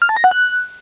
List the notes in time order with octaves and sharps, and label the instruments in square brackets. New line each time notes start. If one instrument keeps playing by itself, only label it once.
[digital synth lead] F6
A5
A#6
F#5
F#6